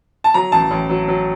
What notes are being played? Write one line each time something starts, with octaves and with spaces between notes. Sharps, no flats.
A5
F#3 A#5
A1 A5
A1
F#3
F#3